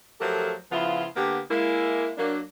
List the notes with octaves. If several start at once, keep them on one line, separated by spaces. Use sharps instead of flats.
F3 F#3 A3 G4 A4 A#4
C#3 F3 B3 E4 F4
D3 A#3 B3 G4
G#3 A#3 E4
F#3 A#3 D4